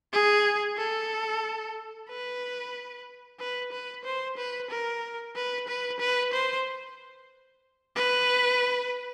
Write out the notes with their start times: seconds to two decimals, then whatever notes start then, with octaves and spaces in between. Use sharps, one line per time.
0.13 G#4
0.78 A4
2.09 B4
3.40 B4
3.72 B4
4.05 C5
4.38 B4
4.70 A#4
5.36 B4
5.68 B4
6.00 B4
6.33 C5
7.96 B4